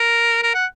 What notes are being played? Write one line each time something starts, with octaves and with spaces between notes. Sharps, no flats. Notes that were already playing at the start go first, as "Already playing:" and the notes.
Already playing: A#4
A#4
F#5